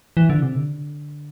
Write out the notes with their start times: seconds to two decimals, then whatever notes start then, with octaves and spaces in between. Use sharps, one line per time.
0.17 E3
0.30 D3
0.42 C3
0.55 D3